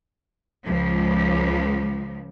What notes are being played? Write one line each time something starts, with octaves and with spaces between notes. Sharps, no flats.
C#2 F3